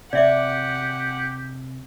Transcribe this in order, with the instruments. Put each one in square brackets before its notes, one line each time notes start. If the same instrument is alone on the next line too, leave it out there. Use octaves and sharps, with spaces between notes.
[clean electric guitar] C3 [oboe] G4 [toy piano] D5 E5 D6 [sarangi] F#5